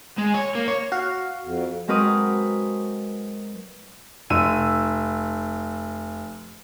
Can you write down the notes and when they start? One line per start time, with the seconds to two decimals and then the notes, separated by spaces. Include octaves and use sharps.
0.18 G#3
0.34 C#5
0.55 A#3
0.68 C#5
0.92 F#4 F5
1.44 F2
1.88 F#3 G#3 C4 A#4 B4 D#6
4.30 F1 E6 D#7